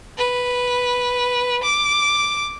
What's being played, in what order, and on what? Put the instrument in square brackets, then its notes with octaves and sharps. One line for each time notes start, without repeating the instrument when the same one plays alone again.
[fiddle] B4
D6